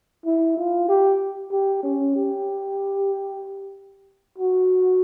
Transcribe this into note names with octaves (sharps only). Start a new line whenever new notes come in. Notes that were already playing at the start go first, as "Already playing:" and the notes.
E4
F4
G4
G4
C#4
G4
F#4